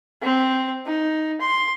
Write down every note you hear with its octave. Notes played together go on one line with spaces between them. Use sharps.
C4
D#4
C6